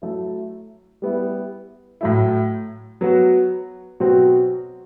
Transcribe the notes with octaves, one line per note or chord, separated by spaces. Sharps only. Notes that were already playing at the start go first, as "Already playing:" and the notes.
F#3 A3 E4
G3 B3 E4
A2 F#3 A3 E4
F#3 B3 F#4
B2 F#3 C4 F#4